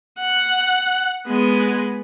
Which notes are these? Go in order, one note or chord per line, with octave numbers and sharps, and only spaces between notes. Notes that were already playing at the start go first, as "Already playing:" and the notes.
F#5
G#3 B3